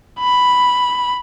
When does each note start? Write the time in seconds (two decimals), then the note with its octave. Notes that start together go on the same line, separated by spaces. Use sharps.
0.20 B5